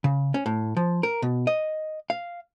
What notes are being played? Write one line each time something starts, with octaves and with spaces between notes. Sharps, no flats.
C#3
C#4
A2
F3
A#4
B2
D#5
F5